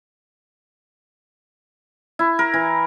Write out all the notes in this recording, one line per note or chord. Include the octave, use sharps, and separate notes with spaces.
E4
A#4
E3